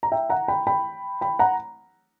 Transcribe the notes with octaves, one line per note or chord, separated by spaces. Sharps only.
A#5
E5 G5
F#5 A#5
G5 B5
G5 B5
G5 B5
F#5 A#5